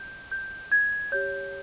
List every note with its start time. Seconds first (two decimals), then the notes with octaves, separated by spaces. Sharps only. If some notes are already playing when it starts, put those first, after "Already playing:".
Already playing: G6
0.32 G6
0.72 G#6
1.12 G4 C#5 G6